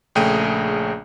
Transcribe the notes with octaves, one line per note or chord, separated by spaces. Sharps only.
A#1 C#3 A3 G#4 G5 D#7